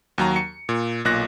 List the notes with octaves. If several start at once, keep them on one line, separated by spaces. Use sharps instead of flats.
D#2 F#3 A#5
C#7
A#2
B1 A#2 F#6 A#6